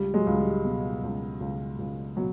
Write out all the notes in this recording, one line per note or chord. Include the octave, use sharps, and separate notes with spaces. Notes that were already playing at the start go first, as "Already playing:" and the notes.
Already playing: C#2 G3
F#3 G#3
C#2
G3
B2
C#2
C#2
C#2
B2 F#3